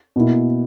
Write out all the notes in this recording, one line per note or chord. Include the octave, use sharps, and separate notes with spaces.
B2 A#3 E4